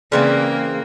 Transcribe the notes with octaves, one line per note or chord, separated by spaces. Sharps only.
C#3 E3 A#3 C4 D5 C6